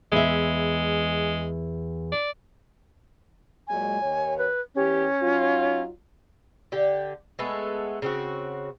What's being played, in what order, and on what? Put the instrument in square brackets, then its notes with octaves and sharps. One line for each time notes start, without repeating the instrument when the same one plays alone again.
[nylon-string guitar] E2 E5 [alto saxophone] G#3
[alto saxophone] D5
[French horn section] A#2 F#3 G#3 [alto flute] G#5
[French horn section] D#2 C#5
[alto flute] B4
[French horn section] E2 E3 G4 [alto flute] C#4
[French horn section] F#3 D#4 F4
[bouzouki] D3 G4
G#3 A3 B3 A4
C#3 C4 F#4